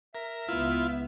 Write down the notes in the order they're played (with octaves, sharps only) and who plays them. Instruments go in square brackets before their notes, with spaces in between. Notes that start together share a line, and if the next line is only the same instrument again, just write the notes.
[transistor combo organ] A#4 [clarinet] E5
[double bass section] C#2 B3 [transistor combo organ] E4 F4